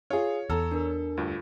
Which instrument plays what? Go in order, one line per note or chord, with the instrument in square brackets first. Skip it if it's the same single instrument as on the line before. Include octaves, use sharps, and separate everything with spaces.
[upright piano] F4 G#4 [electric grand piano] C#5
[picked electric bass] E2 [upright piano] A4 [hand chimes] A#5 E6 F6
[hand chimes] D4 A#4
[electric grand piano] D2 G2 [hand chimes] F4